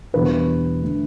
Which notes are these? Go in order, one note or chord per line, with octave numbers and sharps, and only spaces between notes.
E2 B2 G3 D4 B4
D3 A3